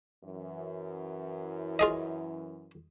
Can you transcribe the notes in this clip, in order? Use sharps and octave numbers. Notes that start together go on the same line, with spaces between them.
F#2 E3 E4
F4 G#4 D#5